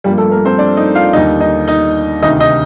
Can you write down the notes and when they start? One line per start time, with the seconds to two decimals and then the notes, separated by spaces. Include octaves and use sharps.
0.04 G2 F3 G3 A#3 G4
0.18 A3 A4
0.31 A#3 A#4
0.45 C4 C5
0.58 D4 D5
0.77 D#4 D#5
0.95 F4 F5
1.13 D#2 D3 G3 A#3 D#4 D#5
1.40 D#4 D#5
1.68 D#4 D#5
2.22 D2 C3 D#3 D#4 D#5
2.40 D#4 D#5